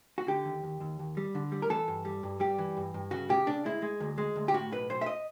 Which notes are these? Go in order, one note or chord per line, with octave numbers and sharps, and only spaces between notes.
F#4
D3 G4
D#2
D#2
D#2
D#2
G3
D3
G3
A#4
E3 A4
G2
G3
G2
G3 G4
E3
G2
G2
C#3 F#4
C#3 G4
C#3 D4
G#3 E4
G#3
D2
G#3
D2
G4
A2 F#4
B1 B4
B1 C5
E5
D#5